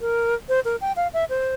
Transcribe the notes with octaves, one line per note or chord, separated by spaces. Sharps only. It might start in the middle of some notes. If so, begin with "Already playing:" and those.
A#4
C5
A#4
G5
F5
E5
C5